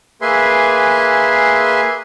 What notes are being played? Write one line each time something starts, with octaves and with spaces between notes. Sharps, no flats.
A#3 G#4 B4 E5 G#5 C6